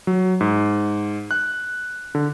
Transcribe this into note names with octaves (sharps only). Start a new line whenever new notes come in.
F#3
G#2
F#6
D3